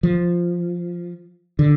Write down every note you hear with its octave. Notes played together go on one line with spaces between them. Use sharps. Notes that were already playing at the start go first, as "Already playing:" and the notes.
F3
D3